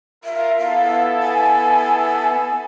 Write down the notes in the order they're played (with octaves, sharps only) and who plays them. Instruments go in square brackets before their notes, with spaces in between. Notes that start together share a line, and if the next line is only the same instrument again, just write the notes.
[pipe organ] F4 A#4 [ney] E5
[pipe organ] B3 E4 A4 [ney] F5
[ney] G#5